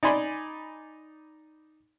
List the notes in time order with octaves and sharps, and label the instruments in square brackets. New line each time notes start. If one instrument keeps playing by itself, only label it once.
[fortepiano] D#4 D5 G#5 B5 C6